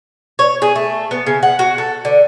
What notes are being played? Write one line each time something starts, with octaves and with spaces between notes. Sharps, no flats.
C#5
G#4
A3
B3
C#3
F#5
F#4
A4
D3